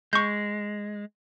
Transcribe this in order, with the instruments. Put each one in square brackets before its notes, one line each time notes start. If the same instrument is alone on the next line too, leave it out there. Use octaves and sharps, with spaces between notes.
[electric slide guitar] G#3 [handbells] C#6 G6